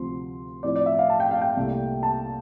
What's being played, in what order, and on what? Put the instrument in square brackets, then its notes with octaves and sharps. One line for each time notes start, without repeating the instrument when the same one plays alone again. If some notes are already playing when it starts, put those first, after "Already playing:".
Already playing: [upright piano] D2 C3 F3 C4 C6
A2 F3 C4 E4 D5
D5
E5
F5
A5
G5
F5
G5
C2 A#2 A3
A5